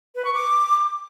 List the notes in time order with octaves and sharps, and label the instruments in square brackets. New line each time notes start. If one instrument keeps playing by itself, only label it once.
[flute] B4
C#6
D6